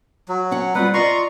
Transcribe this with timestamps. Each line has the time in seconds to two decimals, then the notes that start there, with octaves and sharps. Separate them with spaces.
0.29 F#3
0.51 C#4 F#5
0.75 G3 C4 F4 B4 F#5
0.94 F4 D5 D#5 A#5 C6 C#6